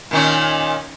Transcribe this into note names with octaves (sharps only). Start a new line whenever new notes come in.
A#2 D#3 C#4